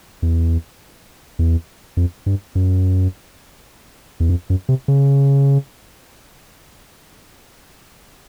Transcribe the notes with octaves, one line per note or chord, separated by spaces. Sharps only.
E2
E2
F2
G2
F#2
E2
F2
F#2
C3
C#3